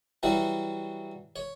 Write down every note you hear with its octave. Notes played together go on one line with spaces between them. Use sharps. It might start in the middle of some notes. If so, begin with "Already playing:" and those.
E3 F#3 G3 F#4
C#5